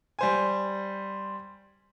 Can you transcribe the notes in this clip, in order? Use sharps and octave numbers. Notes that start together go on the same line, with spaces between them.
G3 C5 G#5